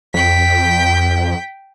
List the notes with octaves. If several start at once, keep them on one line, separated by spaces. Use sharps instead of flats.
F2 G5 B6